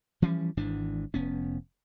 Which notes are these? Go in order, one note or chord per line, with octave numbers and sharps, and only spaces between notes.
E3 F3 G3 C#4
G#1 G#2 E3 D4
F1 B3 C#4